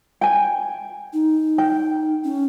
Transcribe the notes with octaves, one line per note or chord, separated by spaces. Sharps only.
G5 G#5
D#4
G5
C#4